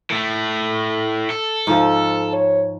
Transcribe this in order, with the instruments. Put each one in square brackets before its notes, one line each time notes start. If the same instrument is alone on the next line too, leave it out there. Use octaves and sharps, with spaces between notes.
[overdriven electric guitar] A2 A3
A4
[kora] G#2 F3 F4
[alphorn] C#5